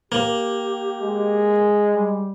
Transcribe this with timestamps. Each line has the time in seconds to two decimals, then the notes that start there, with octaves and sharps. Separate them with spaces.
0.12 A#3 G4
1.02 G#3
1.87 G3